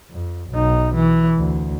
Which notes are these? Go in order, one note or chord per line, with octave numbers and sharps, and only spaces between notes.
F2
B1 D#4
E3
D2